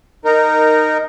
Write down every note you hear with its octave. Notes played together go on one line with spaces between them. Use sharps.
D#4 A#4